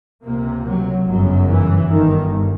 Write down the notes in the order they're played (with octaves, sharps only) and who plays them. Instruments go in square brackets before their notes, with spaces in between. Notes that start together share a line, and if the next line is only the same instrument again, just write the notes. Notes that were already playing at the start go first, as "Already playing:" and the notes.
[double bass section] C#2 C3 A#3
F#3
G1 F#2 C#3 F#3
E3
G1 G2 D#3